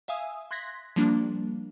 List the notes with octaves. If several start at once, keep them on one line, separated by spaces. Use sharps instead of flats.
E5 F5 G#5 D#6 E6
C6 F#6 G#6 A#6 B6
F3 G3 A#3 D4